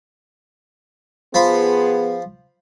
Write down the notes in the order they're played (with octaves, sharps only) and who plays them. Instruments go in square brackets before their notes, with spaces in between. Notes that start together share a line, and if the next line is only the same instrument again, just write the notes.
[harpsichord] F3 C5 B5 [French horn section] B3 G#4